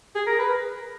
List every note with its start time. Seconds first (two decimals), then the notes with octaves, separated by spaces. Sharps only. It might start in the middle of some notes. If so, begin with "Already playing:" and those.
0.15 G#4
0.27 A#4
0.39 B4